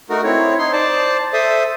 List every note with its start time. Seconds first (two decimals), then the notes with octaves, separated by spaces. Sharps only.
0.10 A3 D#4 F#4 A#4
0.24 C4 E4 C#5
0.59 D#4 C6
0.72 C5 D5 A5
1.33 A4 C5 E5 D#6